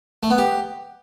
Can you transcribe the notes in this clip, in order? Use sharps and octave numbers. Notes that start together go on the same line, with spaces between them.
A3
B3
G4